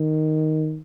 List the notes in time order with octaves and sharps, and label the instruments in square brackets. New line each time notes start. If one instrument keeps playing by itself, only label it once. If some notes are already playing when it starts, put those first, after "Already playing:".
Already playing: [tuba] D#3